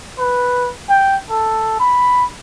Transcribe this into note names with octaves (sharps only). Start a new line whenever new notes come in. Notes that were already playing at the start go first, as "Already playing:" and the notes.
B4
G5
A4
B5